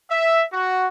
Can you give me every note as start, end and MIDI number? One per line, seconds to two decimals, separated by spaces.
0.10 0.44 76
0.53 0.87 66